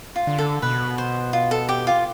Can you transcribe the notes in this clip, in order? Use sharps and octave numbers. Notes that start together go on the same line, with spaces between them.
F4
D3
A4
B2 B4
C5
F4
A4
G4
F4